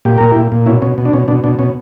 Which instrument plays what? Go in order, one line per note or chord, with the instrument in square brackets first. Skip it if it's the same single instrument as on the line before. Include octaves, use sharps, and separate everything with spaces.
[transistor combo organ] A#2 G4
A#2 A#4
A#2 E4 G4
A#2
B2 C#4 E4
B2 C#4
B2
D4
B2 C#4
B2 D4
B2 D4
B2 C#4